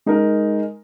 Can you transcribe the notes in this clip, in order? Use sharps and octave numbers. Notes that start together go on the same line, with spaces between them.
G#3 D#4 A#4